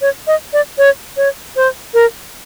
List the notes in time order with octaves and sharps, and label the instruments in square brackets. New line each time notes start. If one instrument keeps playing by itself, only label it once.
[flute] C#5
D#5
D5
C#5
C#5
C5
A#4